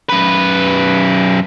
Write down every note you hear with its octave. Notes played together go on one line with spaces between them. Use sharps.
F#2 B4